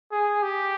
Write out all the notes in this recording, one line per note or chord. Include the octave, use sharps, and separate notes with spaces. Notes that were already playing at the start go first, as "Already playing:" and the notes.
G#4
G4